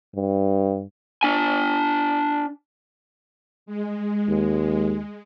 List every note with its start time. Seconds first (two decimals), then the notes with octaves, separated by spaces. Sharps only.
0.15 G2
1.23 D4 G#5
3.66 G#3
4.28 D#2